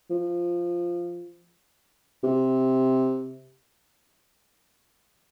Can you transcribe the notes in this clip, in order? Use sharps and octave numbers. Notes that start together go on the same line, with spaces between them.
F3
C3